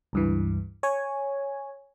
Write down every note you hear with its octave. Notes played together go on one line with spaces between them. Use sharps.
C#2 G2 E3
C#5 G#5